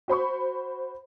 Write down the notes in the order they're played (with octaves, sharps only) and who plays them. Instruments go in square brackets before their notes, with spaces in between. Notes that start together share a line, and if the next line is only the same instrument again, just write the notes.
[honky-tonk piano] F#4 C5 B5 C#6